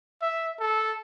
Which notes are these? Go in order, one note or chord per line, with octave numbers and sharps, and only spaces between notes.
E5
A4